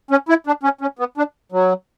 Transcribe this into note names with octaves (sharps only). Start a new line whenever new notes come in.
C#4
E4
D4
C#4
C#4
B3
D4
F#3